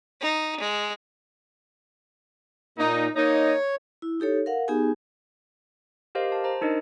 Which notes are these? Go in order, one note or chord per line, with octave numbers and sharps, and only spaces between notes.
D#4
G#3
A#2 A#3 D#4
A#3 D#4 C#5
E4
D#4 G4 A4 C#5
A#4 F5 F#5
B3 D#4 G4 G#4 G#5
G4 A#4 C5 D#5 F5
A5
C5 A#5
D4 D#4 A#4 D#5